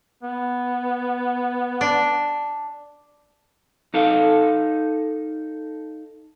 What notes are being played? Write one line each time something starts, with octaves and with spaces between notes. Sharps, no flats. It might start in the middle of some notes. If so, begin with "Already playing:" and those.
B3
D4
D#4 A4 F5